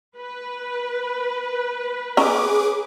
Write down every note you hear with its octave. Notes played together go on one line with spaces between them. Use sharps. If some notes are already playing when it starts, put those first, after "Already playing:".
B4
C#4 G#4 A#5 D6